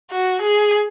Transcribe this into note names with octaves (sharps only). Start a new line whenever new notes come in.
F#4
G#4